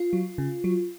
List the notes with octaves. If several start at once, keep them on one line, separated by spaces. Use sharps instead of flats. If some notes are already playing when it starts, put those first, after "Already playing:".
Already playing: F4
F#3
C#3
F#3